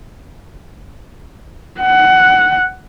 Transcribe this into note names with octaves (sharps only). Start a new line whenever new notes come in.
F#5